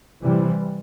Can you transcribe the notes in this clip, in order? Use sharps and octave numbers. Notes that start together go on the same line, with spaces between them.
C3 E3 G3